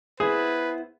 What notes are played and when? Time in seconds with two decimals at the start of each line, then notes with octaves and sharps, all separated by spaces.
0.20 B3 E4 G#4 B4 C5